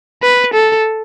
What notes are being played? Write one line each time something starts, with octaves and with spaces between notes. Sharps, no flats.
B4
A4